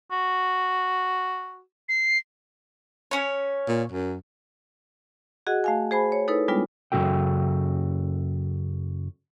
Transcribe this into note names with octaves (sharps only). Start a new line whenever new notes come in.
F#4
C7
C#4 C#5
A#2
F#2
F#4 G#4 D#5 F#5
A3 F5 G#5
G#4 C5 G#5 B5
C#5
D#4 E4 A4 B4 C#5
G3 G#3 B3 D4 F4 G5
F#2 C#3 F#3 F#4 A4 G5